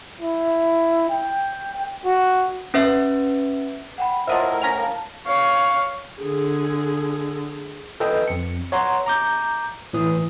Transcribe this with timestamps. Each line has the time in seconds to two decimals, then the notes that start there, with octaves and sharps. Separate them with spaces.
0.21 E4
1.10 G5
2.05 F#4
2.74 C#4 B4 E5
3.98 F#5 G5 B5
4.27 A2 F4 A#4 C5 D#5 E5 F#5 A5
4.63 C#4 A#5
4.80 F5 A5
5.26 C#5 F5
6.22 D3 G#4
8.00 A4 B4 D#5 G5
8.28 F2 C#7
8.72 C#5 F#5 A#5 C6
9.06 A#5 D6 G6
9.93 A2 E3 D#6